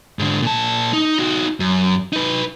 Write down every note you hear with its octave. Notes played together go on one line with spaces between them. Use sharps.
G#2 D3
A#2 A5
D#4
D#4 F#4
F#2
D#4 B4